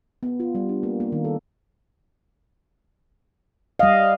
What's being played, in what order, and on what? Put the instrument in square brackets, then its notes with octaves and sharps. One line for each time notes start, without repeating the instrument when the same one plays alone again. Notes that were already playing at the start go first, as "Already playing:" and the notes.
[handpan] B3
F4
G3
D4
A#3
A#3
D#3
A4
[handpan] G3 D#5 [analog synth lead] F5